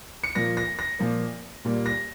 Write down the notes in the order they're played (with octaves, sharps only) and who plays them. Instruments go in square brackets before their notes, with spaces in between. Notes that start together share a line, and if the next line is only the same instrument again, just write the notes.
[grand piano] C#7
A#2 F3 A#3 A#6
A#6
A#6
A#2 F3 A#3
A#2 G3 A#3
A#6